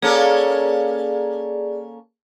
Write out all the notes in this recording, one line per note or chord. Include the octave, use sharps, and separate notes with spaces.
A#3 C#4 G#4 A4 D5